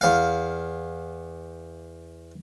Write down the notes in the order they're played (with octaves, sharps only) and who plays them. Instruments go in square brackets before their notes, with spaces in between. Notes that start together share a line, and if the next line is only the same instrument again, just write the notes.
[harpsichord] E2 F5